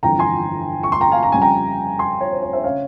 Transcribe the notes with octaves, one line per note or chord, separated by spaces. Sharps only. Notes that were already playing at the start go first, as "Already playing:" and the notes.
G1 F2 E3 G5 A#5
G#5 C6
C#6
C6
G5 A#5
F5 G#5
A#5
F2 C#3 G3 G#5
G5 A#5
G#5 C6
C#5
C5
C#5
C5 E5
C#3 C#5 F5